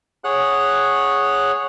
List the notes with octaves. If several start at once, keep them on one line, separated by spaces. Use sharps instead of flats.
G#4 C#5 F#5 F#6